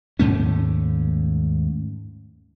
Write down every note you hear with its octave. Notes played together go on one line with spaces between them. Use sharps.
D#2 G#2 A3 C#4